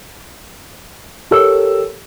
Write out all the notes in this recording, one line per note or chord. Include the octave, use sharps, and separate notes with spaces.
G4 A4 A#4 C#5 E6